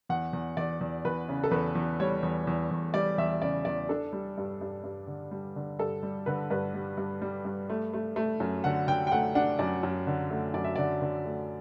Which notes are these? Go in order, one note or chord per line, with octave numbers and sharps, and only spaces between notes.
E2 F#5
E2
E2 D5
E2
E2 B4
C#3
A4
E2 B4
E2
G3 C#5
E2
E2
E2
G3 D5
E2 E5
C#3 D5
E2 D5
D4 A4
G3
G2
G2
G2
D3
G3
D3
G2 A4
G3
D3 B4
G2 B4
G3
G2
G3
G2
A3
A3
A3
F#2
D3 F#5
D3 G5
G5
A3 F#5
D4 F#5
F#2 D5
F#2
D3
A3
F#2 D5
E5
D3 D5
D3
A3